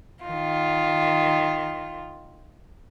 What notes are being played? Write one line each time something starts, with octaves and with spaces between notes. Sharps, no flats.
D#3 F4